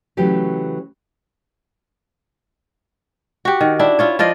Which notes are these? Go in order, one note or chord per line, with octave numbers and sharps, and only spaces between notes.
C#3 E3 F#3 A3 G4 C#5
F#4 G4
D#3
D4 E4
E4 F4 C#5
F3 F4 D5 D#5